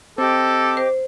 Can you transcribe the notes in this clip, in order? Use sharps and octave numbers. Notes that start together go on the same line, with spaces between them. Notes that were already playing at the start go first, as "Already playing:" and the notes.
C4 G4 A4 D#5 D6
C5